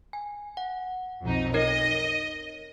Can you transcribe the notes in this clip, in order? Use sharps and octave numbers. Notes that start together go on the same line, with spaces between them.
G#5
F#5
B1 F2 D#4
D#4 A#4 C#5 D#5